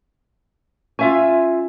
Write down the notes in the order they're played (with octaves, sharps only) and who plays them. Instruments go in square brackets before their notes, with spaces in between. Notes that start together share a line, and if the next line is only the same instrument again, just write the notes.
[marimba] C#4 [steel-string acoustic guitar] F4 E5 G#5